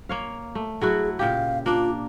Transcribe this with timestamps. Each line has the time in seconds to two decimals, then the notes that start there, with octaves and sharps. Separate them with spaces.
0.09 A#3 C#5 F5
0.55 A3
0.81 F#3 E4 F#4 G#4
1.19 A#2 C#3 G4 F5
1.66 A#3 D4 F4